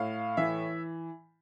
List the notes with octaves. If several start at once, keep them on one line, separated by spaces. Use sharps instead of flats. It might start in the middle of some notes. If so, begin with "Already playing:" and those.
Already playing: A2 F5
E3 E5